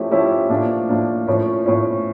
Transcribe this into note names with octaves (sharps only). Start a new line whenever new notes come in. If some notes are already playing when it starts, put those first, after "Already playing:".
Already playing: F3 A3 C#4 E4 G4
F3 A3 C#4 E4 G4
A2 F3 A#3 D4
A2 F3 A#3 D4
A2 F3 C#4
A2 F3 C#4